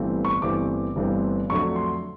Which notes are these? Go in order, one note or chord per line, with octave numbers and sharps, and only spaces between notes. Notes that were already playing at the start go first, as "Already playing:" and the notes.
Already playing: G1 G2 E3 A3 C4
C#6
G1 G2 E3 A3 C4 D6
G1 G2 E3 A3 C4
F2 D3 F#3 A3 C#6
C6